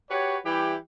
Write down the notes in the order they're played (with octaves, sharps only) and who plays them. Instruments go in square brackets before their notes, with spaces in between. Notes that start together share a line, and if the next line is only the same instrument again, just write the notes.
[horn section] F#4 G4 B4 C#5
E3 G3 E4 G4